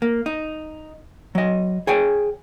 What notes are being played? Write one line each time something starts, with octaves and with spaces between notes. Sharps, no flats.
A#3
D#4
F#3 D#5
G#4 C#5 G5 G#5